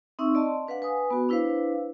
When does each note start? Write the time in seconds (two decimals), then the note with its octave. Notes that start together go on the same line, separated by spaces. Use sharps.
0.19 C4 D#4 E5 C#6 E6
0.35 D5 D#5 A5 C6
0.67 D4 B4 F5 F#5
0.82 B4 G#5 D#6
1.10 B3 F#4
1.29 D4 E4 B4 C5 F5